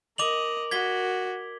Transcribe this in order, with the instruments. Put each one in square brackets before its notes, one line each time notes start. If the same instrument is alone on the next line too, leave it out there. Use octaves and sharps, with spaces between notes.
[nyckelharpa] A#4 [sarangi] D#5 [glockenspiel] D6 F7 F#7
[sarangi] F#4 [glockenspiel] G#6 B6 G7